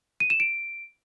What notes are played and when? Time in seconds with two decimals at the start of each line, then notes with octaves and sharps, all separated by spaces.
0.20 D#7
0.30 E7
0.40 D7